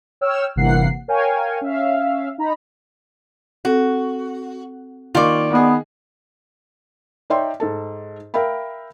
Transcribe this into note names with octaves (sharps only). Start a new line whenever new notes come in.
C#5 G5 E6 F6
G1 C3 E3 A#3 F#5 C7
A#4 C#5 F5 G5 G#5
C#4 E5 F5
D#4 A#5 B5
C4 F#4 A4
D#3 A#3 F4 D5 C#6
D#3 B3 D#4 G#4
D#4 C#5 D5 E5 G5 C6
G#2 A4 A5
A#4 E5 F5 G5 B5